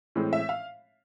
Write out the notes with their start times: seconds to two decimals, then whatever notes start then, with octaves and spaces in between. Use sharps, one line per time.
0.16 A2 E3 G#3 C4
0.33 E5
0.49 F5